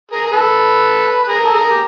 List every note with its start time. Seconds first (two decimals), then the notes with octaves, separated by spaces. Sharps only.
0.12 G#4 A#4
0.26 A#4
0.32 A4 B4
1.23 B4
1.28 G#4 A#4
1.44 A4
1.54 G#4 A#4
1.70 G4